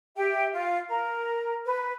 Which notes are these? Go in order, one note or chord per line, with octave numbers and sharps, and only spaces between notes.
G4 E5 G5
F4 F5
A#4 A#5
B4